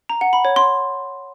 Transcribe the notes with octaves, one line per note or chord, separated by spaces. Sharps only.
A#5
F#5
B5
C#5
C6